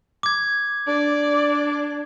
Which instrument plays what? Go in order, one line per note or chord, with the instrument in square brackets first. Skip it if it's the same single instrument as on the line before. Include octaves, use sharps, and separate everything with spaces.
[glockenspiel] D6 G#6
[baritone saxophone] D4 [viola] D5